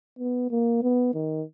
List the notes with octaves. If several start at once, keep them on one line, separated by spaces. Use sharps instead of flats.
B3
A#3
B3
D#3